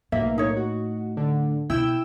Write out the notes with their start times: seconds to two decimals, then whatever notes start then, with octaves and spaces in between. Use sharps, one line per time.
0.12 B1 A2 A#3 E5
0.38 D#4 C#5
0.56 F#4
1.17 D3
1.70 B2 E4 G5 E6